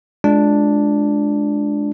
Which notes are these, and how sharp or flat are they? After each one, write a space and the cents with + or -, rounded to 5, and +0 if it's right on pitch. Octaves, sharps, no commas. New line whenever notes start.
G#3 +20 D4 +0 F4 +0